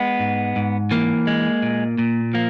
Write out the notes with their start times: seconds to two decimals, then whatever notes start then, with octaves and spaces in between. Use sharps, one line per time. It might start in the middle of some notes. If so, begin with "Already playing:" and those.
Already playing: G#3 B3
0.19 G#2
0.56 G#2
0.91 E3 A#3
1.27 G#3
1.62 A#2
1.98 A#2
2.34 F3 A#3